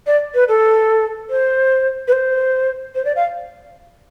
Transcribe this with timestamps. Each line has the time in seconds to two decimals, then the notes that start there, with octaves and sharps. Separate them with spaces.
0.07 D5
0.34 B4
0.48 A4
1.30 C5
2.08 B4
2.12 C5
2.95 C5
3.05 D5
3.16 F5